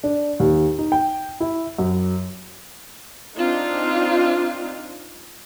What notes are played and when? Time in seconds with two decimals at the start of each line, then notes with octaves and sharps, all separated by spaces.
0.04 D4
0.40 D#2
0.79 D#4
0.92 G5
1.40 E4
1.78 F#2
3.38 C4 D4 D#4 F4